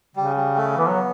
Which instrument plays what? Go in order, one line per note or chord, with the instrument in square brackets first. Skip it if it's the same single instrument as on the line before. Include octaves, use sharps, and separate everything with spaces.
[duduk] C#3 [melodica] G3
[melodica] G3
A3
[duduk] E3 [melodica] B3
[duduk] F#3